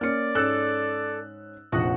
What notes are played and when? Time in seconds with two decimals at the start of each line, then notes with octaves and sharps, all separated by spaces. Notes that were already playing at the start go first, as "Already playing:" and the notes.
0.01 A#3 C#4 D5 F6 C#7
0.35 G#2 C#4 A4 E6 F#6 A6
1.72 F1 A#1 F3 F#4 F#5 D#6